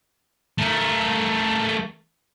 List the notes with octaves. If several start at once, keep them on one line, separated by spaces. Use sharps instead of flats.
A3 A#4